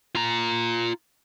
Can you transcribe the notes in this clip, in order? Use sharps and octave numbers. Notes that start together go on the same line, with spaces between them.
F4 A#5